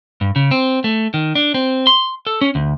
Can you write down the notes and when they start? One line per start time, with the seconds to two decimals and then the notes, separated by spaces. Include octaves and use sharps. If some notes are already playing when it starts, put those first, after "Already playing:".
0.21 G2
0.36 C#3
0.51 C4
0.84 A3
1.14 D#3
1.35 D4
1.54 C4
1.87 C6
2.27 A4
2.41 C#4
2.55 D2